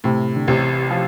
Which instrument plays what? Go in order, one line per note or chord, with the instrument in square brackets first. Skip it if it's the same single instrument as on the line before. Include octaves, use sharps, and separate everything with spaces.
[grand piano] A2 [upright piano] C3
[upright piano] D3
[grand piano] A1 [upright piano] C3
[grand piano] F3